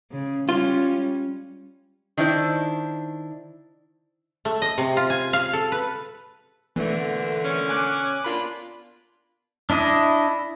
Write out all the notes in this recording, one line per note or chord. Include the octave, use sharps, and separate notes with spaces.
C#3
G3 C#4 F4
D#3 D4 E4 C5
A3
D#5
C3
F4
G#5
F5
A4
B4
A#2 D3 E3 A3 B3
C#4
G#5 D6 F#6
A#3 D4 F4 B5
D4 E4 D#5